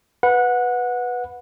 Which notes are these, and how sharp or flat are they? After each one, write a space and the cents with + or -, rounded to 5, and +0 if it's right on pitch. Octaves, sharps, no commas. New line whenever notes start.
B4 +0 F#5 -20